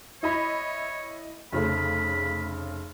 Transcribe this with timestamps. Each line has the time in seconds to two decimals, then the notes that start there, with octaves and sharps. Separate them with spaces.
0.23 E4 C#5 D#5 B5
1.52 F1 C#3 A3 B5